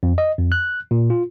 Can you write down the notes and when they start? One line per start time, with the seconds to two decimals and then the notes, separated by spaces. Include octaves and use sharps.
0.03 F2
0.18 D#5
0.38 F2
0.52 F#6
0.91 A#2
1.10 F4